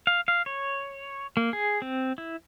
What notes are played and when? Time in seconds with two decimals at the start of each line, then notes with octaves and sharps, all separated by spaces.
0.07 F5
0.28 F5
0.46 C#5
1.37 A#3
1.53 G#4
1.82 C4
2.18 E4